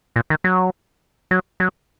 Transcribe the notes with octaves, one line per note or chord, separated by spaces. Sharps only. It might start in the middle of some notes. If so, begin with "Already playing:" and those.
A#2
D#3
F#3
F#3
F#3